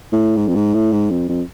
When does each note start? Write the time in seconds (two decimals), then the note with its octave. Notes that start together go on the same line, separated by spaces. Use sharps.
0.12 A2
0.37 G#2
0.48 F2
0.55 G#2
0.74 A2
0.92 G#2
1.10 F2
1.29 F2